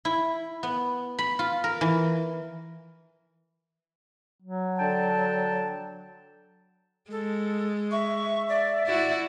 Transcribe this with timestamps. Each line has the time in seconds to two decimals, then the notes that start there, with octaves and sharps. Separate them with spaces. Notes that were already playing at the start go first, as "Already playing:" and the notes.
0.05 E4
0.63 B3
1.19 B5
1.39 F4
1.64 A#4
1.81 E3
4.42 F#3
4.79 D3 G5 A5
7.11 G#3 A4
7.91 E5 C#6
8.49 D5
8.86 E4 F#4 D5